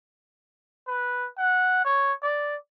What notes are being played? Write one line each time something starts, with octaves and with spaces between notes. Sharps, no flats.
B4
F#5
C#5
D5